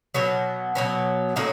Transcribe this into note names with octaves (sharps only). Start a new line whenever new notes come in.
B2 F#3 B3
B2 F#3 B3
A2 F#3 A#3 D#4